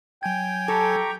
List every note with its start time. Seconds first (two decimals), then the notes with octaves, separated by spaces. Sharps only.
0.23 F#3 G5 G#5 G#6
0.68 G4 A4 A#5 C#6